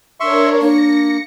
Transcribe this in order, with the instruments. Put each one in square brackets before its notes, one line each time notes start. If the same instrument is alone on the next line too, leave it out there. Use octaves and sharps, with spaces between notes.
[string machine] D4 A#4 C#5 [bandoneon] E5 C6 C#6
[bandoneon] A#3 [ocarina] D4 [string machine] A#6 C#7